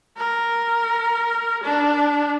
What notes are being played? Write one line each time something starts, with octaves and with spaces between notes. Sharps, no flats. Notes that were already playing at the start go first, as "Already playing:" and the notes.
A#4
D4